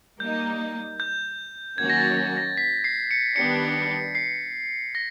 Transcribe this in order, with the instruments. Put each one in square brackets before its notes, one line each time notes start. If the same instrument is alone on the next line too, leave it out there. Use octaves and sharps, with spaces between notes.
[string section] G3 A#3 D#4 [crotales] G6
[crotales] G6
[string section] D#3 F#3 A#3 C#4 F#4 [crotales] G#6
[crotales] A#6
A6
A#6
A#6
B6
C7
C#7
[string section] D#3 G3 B3 D4 G4 [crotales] C#7
[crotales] C7
A#6